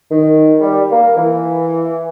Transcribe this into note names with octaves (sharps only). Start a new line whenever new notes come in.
D#3
G3
A#3
E3